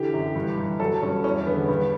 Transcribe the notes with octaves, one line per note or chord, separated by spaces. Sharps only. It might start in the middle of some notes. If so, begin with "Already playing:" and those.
Already playing: D3 E3 G4
F#2
G2
G2
F#3 A4
G2 C#4
E2 C#4
D3 B3
G2